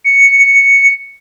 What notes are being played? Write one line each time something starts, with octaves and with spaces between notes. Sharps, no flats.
C#7